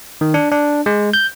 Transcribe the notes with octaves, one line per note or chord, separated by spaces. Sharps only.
D#3
D4
D4
G#3
G6